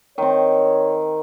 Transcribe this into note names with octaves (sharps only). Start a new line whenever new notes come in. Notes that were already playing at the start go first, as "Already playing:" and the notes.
D#3 C4 C#5